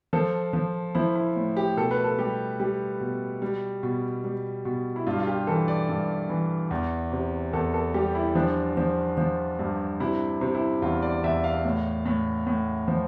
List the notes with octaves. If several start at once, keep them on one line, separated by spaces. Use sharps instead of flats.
F3 A4
F3
F3 E4
E4
A2
G4
B2 A4
B4
A4
G3 G4
G3 G4
B2
G3
B2
G3
B2
E4
G2 F4
F4
G4
E3 A4
D5
G2
E3
E2
C3
E2 A4
A4
G3 G4
E4
F3 D4
F3
F3
G2
C3 E4
C3
E4
E2 F4
D5
E2 E5
F5
A2
A2
A2
F3